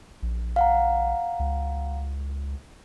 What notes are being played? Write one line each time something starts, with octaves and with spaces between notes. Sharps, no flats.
A#1
F5 F#5 A#5
C#2